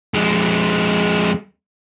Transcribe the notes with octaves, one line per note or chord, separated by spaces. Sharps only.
F2 G#3